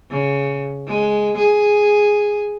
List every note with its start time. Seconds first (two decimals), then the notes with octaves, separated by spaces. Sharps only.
0.11 C#3
0.87 G#3
1.38 G#4